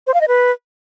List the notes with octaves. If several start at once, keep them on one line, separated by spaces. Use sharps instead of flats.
C5
F5
D#5
B4